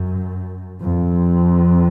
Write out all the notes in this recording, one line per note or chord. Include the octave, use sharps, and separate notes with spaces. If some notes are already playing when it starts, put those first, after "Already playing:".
Already playing: F#2
F2